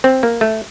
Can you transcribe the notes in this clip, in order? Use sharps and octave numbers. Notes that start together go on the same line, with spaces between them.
C4
A#3
A3